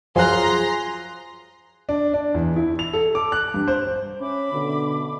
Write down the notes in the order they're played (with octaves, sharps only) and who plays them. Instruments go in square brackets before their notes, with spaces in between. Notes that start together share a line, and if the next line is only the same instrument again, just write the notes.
[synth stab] F#2 F3 [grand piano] F4 F#6 [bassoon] G#4 [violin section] A#5 C6
[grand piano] D4
D4
E2
E4
F7
A4
D6
F#6
G2
C5
[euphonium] C#4 [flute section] E5 B5 D6
[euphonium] B2 [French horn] D3